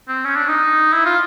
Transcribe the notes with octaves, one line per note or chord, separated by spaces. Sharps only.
C4
C#4
D4
D#4
E4
F4